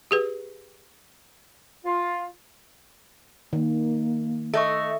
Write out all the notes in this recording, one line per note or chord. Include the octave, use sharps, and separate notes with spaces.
G4 G#4 B4
F4
D#3 A#3
A3 A4 D#5 C#6